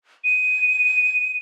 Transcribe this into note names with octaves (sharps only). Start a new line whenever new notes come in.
D#7